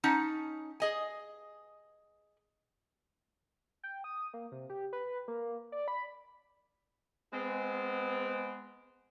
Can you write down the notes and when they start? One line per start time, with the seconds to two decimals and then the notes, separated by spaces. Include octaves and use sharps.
0.04 C#4 D#4 F#5 A5
0.80 G#4 D#5 G#5
3.83 G5
4.04 D#6
4.34 A#3
4.52 C3
4.70 G4
4.93 B4
5.28 A#3
5.72 D5
5.88 B5
7.32 G#3 B3 C4